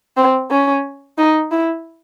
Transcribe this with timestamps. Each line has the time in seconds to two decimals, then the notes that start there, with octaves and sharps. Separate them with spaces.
0.17 C4
0.51 C#4
1.18 D#4
1.51 E4